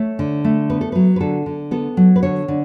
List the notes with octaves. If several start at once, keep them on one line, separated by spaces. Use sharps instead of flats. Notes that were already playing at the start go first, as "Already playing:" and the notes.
Already playing: A3 C#5
D3
A3
B3 B4
A4
F#3 B4
B4
D3 A4
D3
B3 A4
F#3
B4
D3 C#5
D3